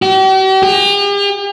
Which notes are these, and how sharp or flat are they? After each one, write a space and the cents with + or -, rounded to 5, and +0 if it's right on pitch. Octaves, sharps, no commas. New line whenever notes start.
G4 -45
G4 +45